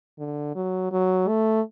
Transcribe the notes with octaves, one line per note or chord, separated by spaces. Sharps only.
D3
F#3
F#3
A3